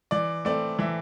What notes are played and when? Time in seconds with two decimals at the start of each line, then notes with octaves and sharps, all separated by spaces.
0.11 E3 D5
0.45 A3 C4 D5
0.79 E3 E5